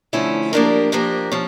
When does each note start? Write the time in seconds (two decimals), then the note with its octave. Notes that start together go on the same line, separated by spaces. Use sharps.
0.13 D3 F3 A3 C#4 E4
0.53 F3 A#3 D4 G4 A#4
0.92 F3 A#3 D4 G4 A#4
1.32 F3 C#4